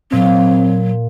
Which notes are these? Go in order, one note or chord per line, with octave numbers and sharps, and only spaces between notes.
A#2 F#3 C4